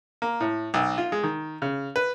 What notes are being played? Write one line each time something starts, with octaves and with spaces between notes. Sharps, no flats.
A#3
A2
B1
F4
G#3
D#3
C#3
B4